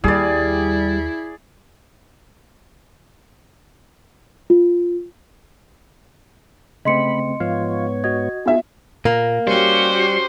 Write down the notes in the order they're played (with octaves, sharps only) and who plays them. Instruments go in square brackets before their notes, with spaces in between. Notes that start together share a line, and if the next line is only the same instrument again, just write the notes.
[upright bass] D#2 [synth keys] G3 [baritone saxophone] E4 [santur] G#4 D5
[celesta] F4
[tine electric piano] C#3 A3 C4 [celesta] D#5 C6 C#7 [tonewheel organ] B5
[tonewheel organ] G#2 B3 C#5 [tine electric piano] F3 F4 F5
[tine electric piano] F#4 D#5 [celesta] G#6
[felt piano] B3 F4 E5 [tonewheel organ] D#4 G#4
[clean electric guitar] A#2 [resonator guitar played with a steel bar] A#3
[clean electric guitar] G3 [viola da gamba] C#4 F#4 G4 [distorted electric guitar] C5